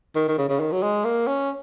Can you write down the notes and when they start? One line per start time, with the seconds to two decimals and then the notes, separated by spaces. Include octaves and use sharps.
0.15 D#3
0.28 D#3
0.38 C#3
0.49 C#3
0.60 D#3
0.72 F#3
0.83 G#3
1.04 A#3
1.27 C#4